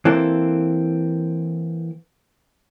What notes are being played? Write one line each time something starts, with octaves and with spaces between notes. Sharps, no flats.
E3 A#3 C4 A4